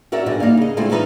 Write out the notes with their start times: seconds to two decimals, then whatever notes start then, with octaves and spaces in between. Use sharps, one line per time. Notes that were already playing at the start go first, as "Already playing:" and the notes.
0.12 C#4 F#4 A#4 D5 E5
0.26 G#2 B2 G3 G#3 D4
0.40 G2 A#3 D#4 F5
0.57 C#3 D#5
0.77 G#3 A3 C4 D4 E4 F4
0.91 E3 D#4 B4 F5